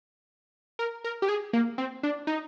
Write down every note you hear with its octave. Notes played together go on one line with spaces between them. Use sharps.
A#4
A#4
G4
G#4
A#3
C4
D4
D#4